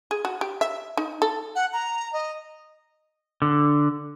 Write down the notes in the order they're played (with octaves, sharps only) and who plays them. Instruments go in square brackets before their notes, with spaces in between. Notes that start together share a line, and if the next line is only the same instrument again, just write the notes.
[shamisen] G#4
F#4
G4
E5
D#4
A4
[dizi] F#5
A#5
D#5
[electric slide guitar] D3